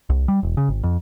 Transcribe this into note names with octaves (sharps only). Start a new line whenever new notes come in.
C2
G3
E1
C#3
G#1
F2